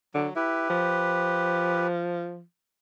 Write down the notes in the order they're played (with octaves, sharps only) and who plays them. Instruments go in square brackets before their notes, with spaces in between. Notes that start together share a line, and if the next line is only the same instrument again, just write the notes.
[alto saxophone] D3 [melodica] F#3
[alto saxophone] E4 [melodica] G4 B4
[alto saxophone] F3